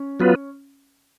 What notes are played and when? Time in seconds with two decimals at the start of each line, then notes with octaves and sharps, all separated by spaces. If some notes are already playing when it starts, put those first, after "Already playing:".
Already playing: C#4
0.20 F#3 B3 F4 B4